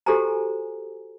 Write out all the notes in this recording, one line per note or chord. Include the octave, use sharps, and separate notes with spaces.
F#4 G4 A4 C5 G#5 A#5